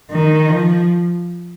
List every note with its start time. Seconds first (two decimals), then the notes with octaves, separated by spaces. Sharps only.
0.11 D#3
0.50 F3